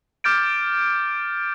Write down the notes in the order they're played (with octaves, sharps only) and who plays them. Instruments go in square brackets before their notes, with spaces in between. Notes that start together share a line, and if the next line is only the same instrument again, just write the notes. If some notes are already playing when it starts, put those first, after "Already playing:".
[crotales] D6 F6 G6 A6 D7